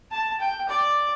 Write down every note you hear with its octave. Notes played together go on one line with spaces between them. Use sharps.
A5
G5
D5